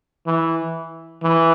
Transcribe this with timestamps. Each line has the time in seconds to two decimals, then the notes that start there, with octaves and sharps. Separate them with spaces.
0.26 E3
1.23 E3